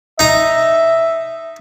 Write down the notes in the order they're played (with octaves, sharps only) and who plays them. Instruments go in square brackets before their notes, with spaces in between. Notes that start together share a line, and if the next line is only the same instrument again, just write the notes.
[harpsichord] D#4 A#5 [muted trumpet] E5